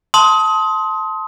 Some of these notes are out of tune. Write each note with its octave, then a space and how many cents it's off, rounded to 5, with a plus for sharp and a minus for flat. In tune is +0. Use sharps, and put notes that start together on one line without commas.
A5 +0 C6 +0 D#6 +30